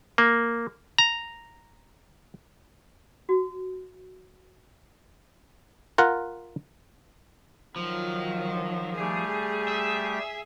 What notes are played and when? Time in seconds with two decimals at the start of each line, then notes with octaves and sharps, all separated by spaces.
0.18 A#3
0.98 A#5
3.29 F#4
5.98 F4 A#4 F#5
7.76 D#3 F3 F#3
8.99 G3 A3 G4 G#4
9.68 E5